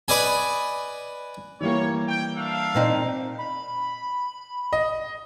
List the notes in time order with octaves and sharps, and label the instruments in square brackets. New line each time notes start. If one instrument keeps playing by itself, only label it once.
[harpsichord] B4 D5 D#5 G#5
[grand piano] E3 G3 A#3 [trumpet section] C#5
[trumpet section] G5
D4 E5 F5
[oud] A#2 C4 D#4
[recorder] B5
[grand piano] D#5